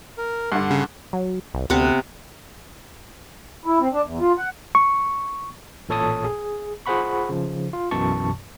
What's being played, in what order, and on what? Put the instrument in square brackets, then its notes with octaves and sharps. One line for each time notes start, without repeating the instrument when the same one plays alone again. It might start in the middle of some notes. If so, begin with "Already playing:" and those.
[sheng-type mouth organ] A#4
[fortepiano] G2 D3 [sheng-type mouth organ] F#5
[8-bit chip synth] C#3
[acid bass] F#3
C2
[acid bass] D2 [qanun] C3 B3 F#5
[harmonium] E4
C4
D4
E2
F4
F#5
[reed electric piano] C#6
[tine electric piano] A1 A#2 A4 C#5 A5 D#6
G#4
F4 G#4 C5 F#5 B5 C#6
C#3 F3
F4
B1 F#2 B2 E3 A5 C#6